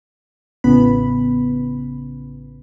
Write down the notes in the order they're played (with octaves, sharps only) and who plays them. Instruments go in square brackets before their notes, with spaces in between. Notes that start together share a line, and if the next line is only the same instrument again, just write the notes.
[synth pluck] A1 C#3 B3 B5